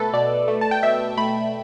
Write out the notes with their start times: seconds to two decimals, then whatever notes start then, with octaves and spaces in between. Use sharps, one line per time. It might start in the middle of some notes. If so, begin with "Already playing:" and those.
Already playing: B2 A3 A4 B4
0.14 B2 D5
0.48 A3
0.61 A5
0.71 G5
0.83 B2 E5
1.17 A3 B5